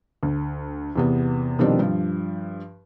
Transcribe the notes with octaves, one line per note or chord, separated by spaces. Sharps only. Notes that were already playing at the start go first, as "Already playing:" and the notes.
D2
E2 C3 B3
B2 D#3 F3 G3 C4 D4
G2 F3